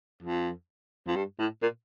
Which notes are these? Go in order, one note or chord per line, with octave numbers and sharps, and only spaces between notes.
F2
F2
G2
A2
A#2